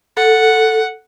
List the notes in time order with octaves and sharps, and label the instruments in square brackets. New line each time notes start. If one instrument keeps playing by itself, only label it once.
[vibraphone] A4 [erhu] F#5